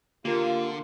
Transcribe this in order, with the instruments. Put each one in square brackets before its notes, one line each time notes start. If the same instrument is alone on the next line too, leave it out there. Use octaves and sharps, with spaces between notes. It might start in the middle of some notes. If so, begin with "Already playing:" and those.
[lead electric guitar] D3 [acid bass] A#3 [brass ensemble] F4 [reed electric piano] G4 A#4